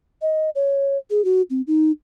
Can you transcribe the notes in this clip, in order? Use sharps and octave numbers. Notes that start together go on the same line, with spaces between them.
D#5
C#5
G#4
F#4
C4
D#4